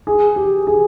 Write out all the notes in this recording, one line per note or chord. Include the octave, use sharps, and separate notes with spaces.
G#4
G4
G#4